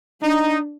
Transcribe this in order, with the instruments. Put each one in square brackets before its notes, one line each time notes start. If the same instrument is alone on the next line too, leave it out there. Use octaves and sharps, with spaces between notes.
[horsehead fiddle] D4 [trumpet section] D#4